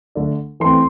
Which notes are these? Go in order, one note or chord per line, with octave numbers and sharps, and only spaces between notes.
D3 A3 D4
E3 A3 C4 C6